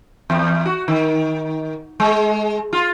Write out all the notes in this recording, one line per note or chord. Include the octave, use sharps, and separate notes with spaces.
E2
F#4
D#3
G#3
F4